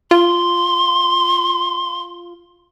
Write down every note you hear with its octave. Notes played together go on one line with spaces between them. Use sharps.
F4 C6